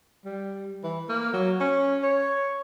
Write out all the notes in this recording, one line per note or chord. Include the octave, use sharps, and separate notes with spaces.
G3
E3
A#3
F#3
C#4
C#5